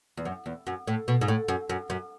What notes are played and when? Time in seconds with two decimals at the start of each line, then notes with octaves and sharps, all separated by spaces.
0.17 E2
0.25 F#2
0.46 E2
0.67 F#2
0.87 A2
1.08 B2
1.21 G#2
1.28 A2
1.48 F#2
1.70 F#2
1.90 F#2